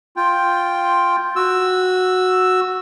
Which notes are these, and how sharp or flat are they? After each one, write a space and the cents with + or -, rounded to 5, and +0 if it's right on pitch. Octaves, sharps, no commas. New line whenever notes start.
F4 +0 G5 +0
F#4 -5 E6 +0